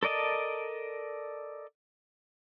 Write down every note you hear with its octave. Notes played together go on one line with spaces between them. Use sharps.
A4 A#4 D5 D#5 A5